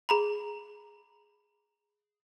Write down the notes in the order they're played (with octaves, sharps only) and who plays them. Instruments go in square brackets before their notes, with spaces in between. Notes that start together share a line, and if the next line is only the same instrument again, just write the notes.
[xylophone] G#4 A#5 B5